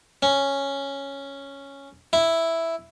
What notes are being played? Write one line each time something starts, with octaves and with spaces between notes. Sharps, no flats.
C#4
E4